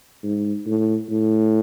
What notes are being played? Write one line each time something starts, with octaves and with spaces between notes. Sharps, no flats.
G#2
A2
A2